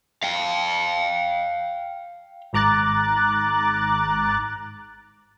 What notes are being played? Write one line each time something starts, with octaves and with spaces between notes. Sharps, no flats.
F5 G5
G#1 G#2 A#5 D6 F#6 A6